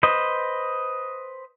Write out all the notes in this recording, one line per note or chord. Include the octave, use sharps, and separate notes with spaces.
B4 C5 D#5